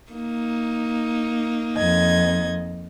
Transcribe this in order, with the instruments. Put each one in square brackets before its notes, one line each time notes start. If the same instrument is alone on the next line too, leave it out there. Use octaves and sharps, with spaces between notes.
[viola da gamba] A#3 D#4
[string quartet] F2 D#5 G#6